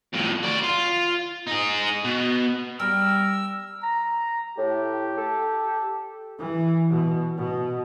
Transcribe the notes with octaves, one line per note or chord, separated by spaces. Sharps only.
F2 A2
F#4 D5
F4
D#4 G#4
B2
G3 A#4 E6
A#5
A2 G4
A4
E3
B2
B2